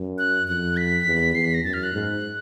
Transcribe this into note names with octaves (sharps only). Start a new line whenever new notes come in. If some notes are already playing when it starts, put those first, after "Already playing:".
Already playing: F#2
F#6
F2 F#6
B6
E2
E2 C7
B6
A#6
F#2 A6
F6
F#6
G#2